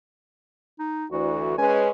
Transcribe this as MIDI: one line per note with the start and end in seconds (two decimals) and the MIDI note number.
0.79 1.06 63
1.12 1.57 38
1.12 1.57 52
1.12 1.55 66
1.58 1.90 56
1.58 1.90 61
1.58 1.90 71
1.58 1.82 80